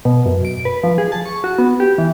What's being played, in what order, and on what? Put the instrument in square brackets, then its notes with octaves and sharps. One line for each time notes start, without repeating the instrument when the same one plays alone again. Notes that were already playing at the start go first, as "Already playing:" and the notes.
[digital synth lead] B2
F#2
D7
B4
F3
G#4
A5
C#6
F#4
B3
G4
E3